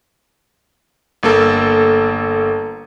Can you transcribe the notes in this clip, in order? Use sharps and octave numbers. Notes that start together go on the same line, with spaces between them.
G1 A#3 A4